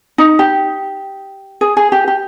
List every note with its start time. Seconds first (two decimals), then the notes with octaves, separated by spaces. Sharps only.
0.18 D#4
0.39 G4
1.61 G#4
1.77 G#4
1.92 G4
2.08 G4